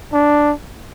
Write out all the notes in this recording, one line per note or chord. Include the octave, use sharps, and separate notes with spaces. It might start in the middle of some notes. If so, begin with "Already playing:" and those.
D4